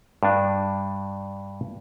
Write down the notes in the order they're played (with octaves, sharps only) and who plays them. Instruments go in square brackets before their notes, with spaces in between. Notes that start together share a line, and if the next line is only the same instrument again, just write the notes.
[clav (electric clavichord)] G2 D4